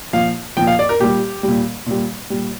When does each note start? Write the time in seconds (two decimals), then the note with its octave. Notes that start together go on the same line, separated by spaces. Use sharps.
0.13 A#2 F3 F5
0.57 A#2 F3 G5
0.67 F5
0.79 D5
0.89 A#4
1.00 A#2 G3 G4
1.43 A#2 G3
1.86 A#2 G3
2.30 A#2 G3